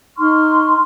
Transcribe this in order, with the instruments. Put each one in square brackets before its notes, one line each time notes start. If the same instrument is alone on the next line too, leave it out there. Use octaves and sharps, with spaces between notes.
[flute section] D#4 C6 C#6 F6